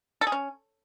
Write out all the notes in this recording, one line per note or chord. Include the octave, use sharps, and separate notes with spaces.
A4
G#4
C#4